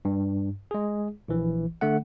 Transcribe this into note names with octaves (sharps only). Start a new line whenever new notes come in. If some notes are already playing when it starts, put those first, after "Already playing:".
G2
G#3 G#4
A#1 E3
D3 A3 F#5